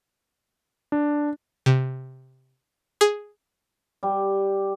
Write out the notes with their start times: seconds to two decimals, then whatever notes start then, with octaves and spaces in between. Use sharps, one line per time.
0.92 D4
1.66 C3
3.01 G#4
4.03 G3